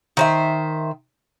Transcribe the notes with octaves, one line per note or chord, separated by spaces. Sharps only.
D#3 C5 E5